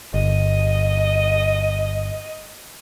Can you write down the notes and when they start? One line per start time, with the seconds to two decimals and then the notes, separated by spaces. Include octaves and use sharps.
0.14 G1 D#5